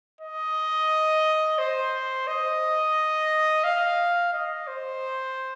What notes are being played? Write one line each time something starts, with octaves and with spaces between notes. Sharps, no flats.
D#5
C5
D#5
F5
D#5
C5